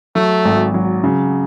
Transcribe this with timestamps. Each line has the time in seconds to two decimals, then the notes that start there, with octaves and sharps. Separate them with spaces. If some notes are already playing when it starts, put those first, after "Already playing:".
0.16 F#3 A3
0.45 G#1
0.74 F#3
1.04 C#3